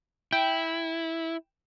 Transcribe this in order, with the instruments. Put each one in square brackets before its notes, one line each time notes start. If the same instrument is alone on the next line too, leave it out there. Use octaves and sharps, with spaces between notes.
[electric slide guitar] E4 [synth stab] G5